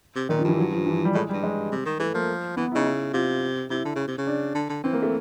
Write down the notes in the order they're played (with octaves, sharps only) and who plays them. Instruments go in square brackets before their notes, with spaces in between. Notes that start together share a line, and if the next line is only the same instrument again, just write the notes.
[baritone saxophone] C3
[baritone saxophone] A#2 [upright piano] D#3
[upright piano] F3
[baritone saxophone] G2 [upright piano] E3
[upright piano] F#3
F3
E3
G3
[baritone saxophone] A2 [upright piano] G#3
[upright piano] G3
[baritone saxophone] G2
[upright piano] G#3
[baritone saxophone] C3
D#3
[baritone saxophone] E3 [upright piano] A3
[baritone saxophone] F3 [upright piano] A#3
[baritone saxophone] E3 [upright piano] B3
[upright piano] E4
[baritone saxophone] C#3 [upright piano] D#4
[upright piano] E4
[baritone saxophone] C3 [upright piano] F4
[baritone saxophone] C3 [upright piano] E4
[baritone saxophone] D3
C#3
C3
C#3
[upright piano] D4
[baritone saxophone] D3
D3
[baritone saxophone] E3 [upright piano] C4
[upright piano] A#3
A3